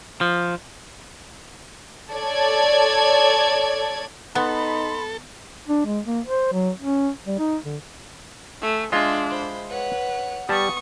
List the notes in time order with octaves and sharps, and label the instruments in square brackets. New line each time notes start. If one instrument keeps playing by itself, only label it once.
[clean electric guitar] F3
[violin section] A4 C#5 D5 G#6
[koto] B3 [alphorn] D#4 [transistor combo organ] A4 [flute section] B5 C6
[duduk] D4
G#3
A#3
C5
F#3
C#4
G3
D#4
D3
[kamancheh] A3 [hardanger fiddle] G#5
[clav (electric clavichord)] G#3 F4 [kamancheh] D4 [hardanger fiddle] E5 C6
[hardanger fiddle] C5 B5
[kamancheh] B4 [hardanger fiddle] C#5 F#5
[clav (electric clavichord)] G3 A5 [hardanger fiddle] B3 [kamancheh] C#6 D#6